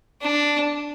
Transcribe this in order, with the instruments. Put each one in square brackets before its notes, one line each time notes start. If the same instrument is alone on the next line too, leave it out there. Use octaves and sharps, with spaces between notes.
[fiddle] D4